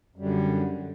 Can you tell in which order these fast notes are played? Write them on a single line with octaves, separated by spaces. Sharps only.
F#2 G3 D3